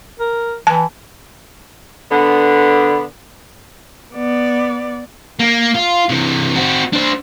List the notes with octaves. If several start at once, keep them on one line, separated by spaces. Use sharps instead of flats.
A#4
E3 A5
D3 B3
B3 D5
A#3
F4
C3 E3
C4 F#4
D4 C5